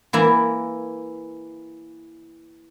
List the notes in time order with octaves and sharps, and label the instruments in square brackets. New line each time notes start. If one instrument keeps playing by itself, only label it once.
[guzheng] E3 A#3 E4